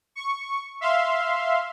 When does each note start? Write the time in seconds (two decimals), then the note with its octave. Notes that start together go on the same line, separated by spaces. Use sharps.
0.15 C#6
0.81 E5 F5 C6